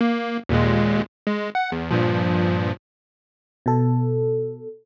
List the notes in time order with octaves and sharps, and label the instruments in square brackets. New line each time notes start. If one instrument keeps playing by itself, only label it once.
[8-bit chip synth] A#3
D#2 A#2 G#3
G#3
F#5
E2
G2 A#2 F3
[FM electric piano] B2 A4